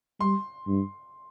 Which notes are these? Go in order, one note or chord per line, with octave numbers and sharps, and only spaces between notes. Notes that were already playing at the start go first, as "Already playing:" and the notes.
G3 C6
G2